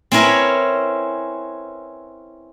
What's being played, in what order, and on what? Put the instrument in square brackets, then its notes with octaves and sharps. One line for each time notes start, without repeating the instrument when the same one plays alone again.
[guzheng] C4 C#4 E4 A#4 B4 C#5